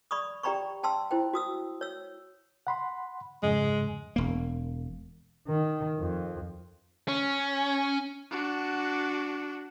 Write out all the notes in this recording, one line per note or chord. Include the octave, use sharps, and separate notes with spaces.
D5 B5 C#6 D#6
G4 D5 G5 A#5 B5 C#6
G5 A5 C6 E6
E4 C5 G5
F#4 D#6 E6
C#5 E6
F#5 B5 C6
F2 G#2 C#3 G#3
E1 A#3
D#3
F2
C#4
D4 F#4